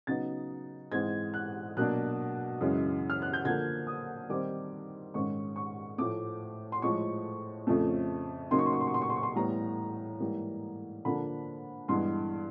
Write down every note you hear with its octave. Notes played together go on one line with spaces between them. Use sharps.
C#3 F#3 B3 D#4 A6
G#2 E3 G#3 C4 G#6
F#6
B2 F#3 A#3 D4 F#6
F#2 C#3 E3 G#3
F6
F#6
G6
D3 F3 A#3 G#6
D#6
D#3 G3 C4 D#4 D6
G#2 D#3 G#3 C#4 C#6
C#6
A2 F3 A3 D6
C6
A2 F3 G#3 C#6
F2 C#3 F3 A3
C#3 F#3 A#3 D#4 C6
C#6
C6
C#6
C6
C#6
C6
C#6
C6
C#6
C6
A2 E3 G3 B3 A#5
G#2 E3 G3 A#3
D3 F3 A#3 D4 B5
G2 E3 G#3 B3 C6